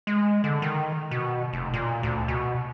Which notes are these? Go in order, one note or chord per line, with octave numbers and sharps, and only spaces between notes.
G#3
D3
D#3
B2
F1
A#2
D2
B2